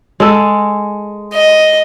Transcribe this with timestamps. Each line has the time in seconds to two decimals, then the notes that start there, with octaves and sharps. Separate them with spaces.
0.20 G#3 A4
1.34 D#5